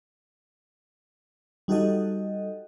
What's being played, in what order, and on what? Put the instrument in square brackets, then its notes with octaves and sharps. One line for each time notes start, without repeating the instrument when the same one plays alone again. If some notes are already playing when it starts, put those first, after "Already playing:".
[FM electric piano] G3 D#4 F#4 G4 A4 D#5